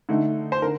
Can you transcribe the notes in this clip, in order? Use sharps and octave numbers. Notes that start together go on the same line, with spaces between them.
D3 A3 D#4
C5
D3 A#4